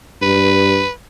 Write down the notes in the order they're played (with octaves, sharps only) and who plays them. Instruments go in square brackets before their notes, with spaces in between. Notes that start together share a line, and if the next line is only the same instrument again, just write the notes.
[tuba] G2 [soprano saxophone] B4